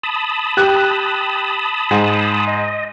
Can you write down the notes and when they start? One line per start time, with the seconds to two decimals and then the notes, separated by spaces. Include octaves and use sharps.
0.03 A5 B5 D#6
0.57 G4 F#6
1.91 G#2
2.47 D#5